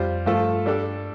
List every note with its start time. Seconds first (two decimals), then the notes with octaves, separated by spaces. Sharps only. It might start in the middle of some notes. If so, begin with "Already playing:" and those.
Already playing: F2 G3 F4 C5
0.26 G2 F3 A3 F4 A4
0.66 G3 D4 A4 D5